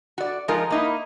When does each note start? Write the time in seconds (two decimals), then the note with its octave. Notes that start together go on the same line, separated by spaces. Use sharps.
0.18 F#4 D5
0.48 F3 G#3 D#4 F4 A#4
0.70 A#3 D#4 E4